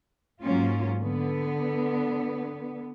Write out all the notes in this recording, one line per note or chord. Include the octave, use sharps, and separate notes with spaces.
G#2 F#3 A#3 C#4 F4
D3 B3